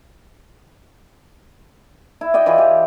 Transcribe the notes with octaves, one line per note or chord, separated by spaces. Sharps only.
E4
D5 D#5 G5
E3 F4 G#4
G4